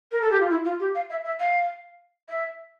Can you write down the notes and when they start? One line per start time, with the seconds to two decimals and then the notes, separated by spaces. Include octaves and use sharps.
0.12 A#4
0.22 A4
0.31 G4
0.40 F4
0.50 E4
0.65 F4
0.80 G4
0.95 F5
1.10 E5
1.25 E5
1.40 F5
2.29 E5